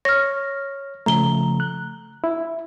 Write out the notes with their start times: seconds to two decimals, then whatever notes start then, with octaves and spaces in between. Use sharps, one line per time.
0.05 C#5 F6 A#6
1.06 C#3 F3 A3 A#5 G7
1.60 F#6
2.24 E4